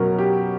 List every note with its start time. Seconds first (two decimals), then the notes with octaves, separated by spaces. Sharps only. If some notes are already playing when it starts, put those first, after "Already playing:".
Already playing: B2 F#3 C#4 A#4
0.18 G4